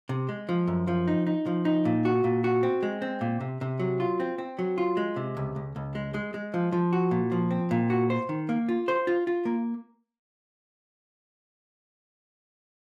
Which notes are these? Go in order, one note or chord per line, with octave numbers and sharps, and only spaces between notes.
C3
G#3
F3
F#2
F3
D#4
D#4
F3
D#4
A#2
F#4
A#2
F#4
C4
G#3
C4
A#2
C3
C3
F#3
F4
C4
C4
F#3
F4
G#3
C3
C#2
C#2
C#2
G#3
G#3
G#3
F3
F3
F#4
A#2
F3
C4
A#2
F#4
C5
D#3
A#3
F4
C5
F4
F4
A#3